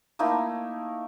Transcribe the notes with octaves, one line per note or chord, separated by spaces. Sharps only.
A3 A#3 D#4 E4